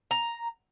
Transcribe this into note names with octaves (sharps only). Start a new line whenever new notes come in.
A#5